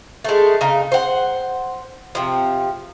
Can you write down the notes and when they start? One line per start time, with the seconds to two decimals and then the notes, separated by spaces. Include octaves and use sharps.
0.24 G#3 A3
0.61 C#3 D#4
0.92 C5 F#5
2.15 C3 F3